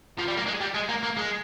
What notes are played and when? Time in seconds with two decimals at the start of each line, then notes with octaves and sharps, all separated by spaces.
0.18 F3
0.28 G3
0.37 A#3
0.47 G#3
0.61 G3
0.74 G#3
0.89 A#3
1.03 A#3
1.17 G#3